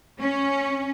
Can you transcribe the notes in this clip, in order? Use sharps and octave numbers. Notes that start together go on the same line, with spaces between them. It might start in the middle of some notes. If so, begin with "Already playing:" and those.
C#4